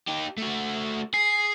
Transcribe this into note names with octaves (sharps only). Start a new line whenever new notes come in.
D#4 G4
A3 F#4
G#4 C7